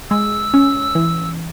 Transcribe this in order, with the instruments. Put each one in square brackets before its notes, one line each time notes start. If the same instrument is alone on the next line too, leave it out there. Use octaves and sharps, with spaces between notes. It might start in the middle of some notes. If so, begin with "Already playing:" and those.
[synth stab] G#3 [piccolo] E6
[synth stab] C#4
E3